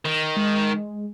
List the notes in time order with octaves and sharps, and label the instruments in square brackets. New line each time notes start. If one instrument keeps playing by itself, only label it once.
[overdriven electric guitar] D#3
[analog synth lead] G#3